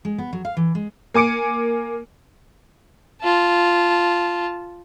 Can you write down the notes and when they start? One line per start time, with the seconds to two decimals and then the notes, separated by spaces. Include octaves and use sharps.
0.05 G#3
0.18 B3
0.33 F#3
0.45 F5
0.57 E3
0.75 G#3
1.14 A#3 G#5 D6 C#7 D7
3.22 F4 A5